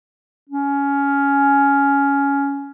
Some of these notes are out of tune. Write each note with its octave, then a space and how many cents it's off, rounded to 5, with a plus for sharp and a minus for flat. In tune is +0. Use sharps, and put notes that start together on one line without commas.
C#4 +15